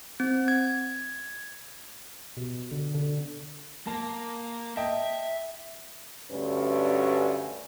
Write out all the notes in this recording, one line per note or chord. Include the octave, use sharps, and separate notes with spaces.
C4
G#6
B2
D3
D3
A#3 A5
D#5 E5 G5 A5
D2 G2 C#4 B4